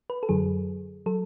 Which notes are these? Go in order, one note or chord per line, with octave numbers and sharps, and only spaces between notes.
B4
A4
F#2 D3 F#3 G#4
F#3 A4